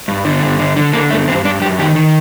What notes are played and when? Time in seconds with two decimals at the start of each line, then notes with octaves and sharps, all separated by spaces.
0.08 G2
0.25 D3
0.42 G2
0.59 D3
0.76 D3
0.93 D3 A#3
1.10 G2 A3
1.27 G2 C4
1.45 G2 D4
1.61 F#2 G4
1.79 D#3 G4
1.95 D#3